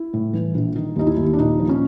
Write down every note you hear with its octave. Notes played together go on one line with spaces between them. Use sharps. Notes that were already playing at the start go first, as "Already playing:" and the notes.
Already playing: E4
A2
E3
A#1
D#3 D#4
D#2 D#4
E4
D#2
D4
A#2 D#4
F3
C#4